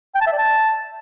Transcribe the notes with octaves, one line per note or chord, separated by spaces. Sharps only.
G5
A5
E5
D5
A5